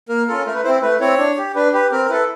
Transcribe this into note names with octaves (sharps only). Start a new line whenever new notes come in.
A#3 A#4
C#4 F4 A4 A#4
A3 A#4
B4
C4 E4 C5
A3 B4
C4 E4 C#5
D4
G4
D4 B4
G4 B4
C4 A#4
A#4
E4 A4 B4